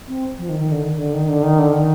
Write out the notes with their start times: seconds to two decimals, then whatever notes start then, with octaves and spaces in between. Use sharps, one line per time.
0.08 C4
0.38 F3
0.49 D#3
0.60 D#3
0.71 D3
0.83 D#3
0.98 D3
1.13 D#3
1.28 D3
1.43 D#3
1.58 D3
1.73 D#3